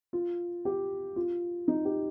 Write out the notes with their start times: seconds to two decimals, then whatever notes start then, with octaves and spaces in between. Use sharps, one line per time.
0.13 F4
0.65 G4
1.16 F4
1.68 D#4
1.85 G4